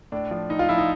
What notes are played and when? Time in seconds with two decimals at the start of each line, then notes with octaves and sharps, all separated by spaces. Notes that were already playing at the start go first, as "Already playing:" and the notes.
0.12 A2 D4
0.31 F3
0.50 A2 D#4
0.59 F4
0.69 F3 E4
0.78 D#4